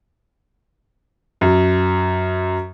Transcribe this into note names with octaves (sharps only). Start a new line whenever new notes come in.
F#2